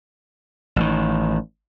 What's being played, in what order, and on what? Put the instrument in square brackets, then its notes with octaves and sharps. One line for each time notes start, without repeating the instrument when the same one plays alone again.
[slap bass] A1 D#3